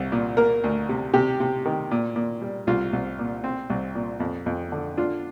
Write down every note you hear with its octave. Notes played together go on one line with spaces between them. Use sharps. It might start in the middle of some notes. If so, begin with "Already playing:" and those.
Already playing: C2
A#2
A#3 A#4
D2
C3
C3 G4
C3
D#3
A#2
A#2
G3
C2 F4
C2
A#2
C4
C2
A#2
F2
F2
D3
D4 F4